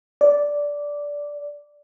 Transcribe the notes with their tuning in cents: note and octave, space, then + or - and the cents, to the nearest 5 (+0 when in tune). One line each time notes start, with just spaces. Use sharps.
D5 -10